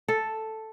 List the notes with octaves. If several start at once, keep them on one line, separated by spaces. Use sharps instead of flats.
A4